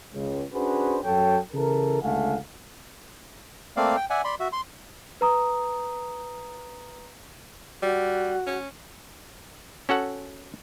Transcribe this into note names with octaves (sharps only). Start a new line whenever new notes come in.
C#2
C#4 D4 F#4 G#4 B4 C5
F#2 F#3 A4 C#5 G5
C#3 E3 A4 A#4
C#2 D3 A3 F5 F#5 G#5
A3 A#3 C4 D5 F5
G5
D5 E5 F#5 G#5
D5 B5 C6
F#4 E5
C6
B4 A#5 D#6
G3 F#4
C#4
C#4 F#4 A4 F#5